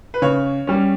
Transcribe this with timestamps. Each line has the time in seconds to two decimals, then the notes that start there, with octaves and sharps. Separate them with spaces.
0.14 B4
0.22 C#3 C#5
0.67 G3 C#4